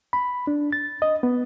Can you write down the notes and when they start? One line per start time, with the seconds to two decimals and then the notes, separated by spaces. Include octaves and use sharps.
0.13 B5
0.47 D4
0.72 A6
1.02 D#5
1.23 B3